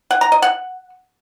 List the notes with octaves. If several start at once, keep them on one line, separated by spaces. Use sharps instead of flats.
F#5
A#5
D#5
F#5